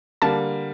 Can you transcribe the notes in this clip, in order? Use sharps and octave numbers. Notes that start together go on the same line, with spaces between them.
D3 G3 A#3 A5